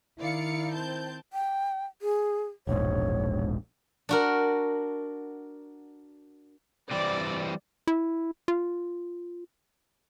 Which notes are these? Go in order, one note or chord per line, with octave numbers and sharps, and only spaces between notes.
D#3 E4 D5 F5 C#7
C4 A5 G6
G5
G#4
E1 A#1 G#2 C#5
D4 F#4 A#4
E3 G3 C4 D5
E4
F4